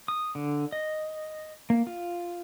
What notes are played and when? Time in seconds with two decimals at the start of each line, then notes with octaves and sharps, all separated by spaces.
0.08 D#6
0.35 D3
0.72 D#5
1.70 A#3
1.87 F4